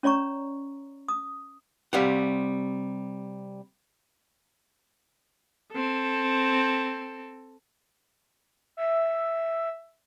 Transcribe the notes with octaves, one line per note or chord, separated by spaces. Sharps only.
C#4 C#5 D5 A#5 C#6
D#6
C3 G3 F5 F#5
C4 A4
E5